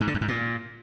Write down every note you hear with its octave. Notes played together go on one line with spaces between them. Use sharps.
G#2
D3
F#2
G#2
A#2